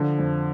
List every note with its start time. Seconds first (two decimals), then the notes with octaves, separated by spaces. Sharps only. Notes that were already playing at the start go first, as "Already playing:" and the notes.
Already playing: D3 F3
0.19 F2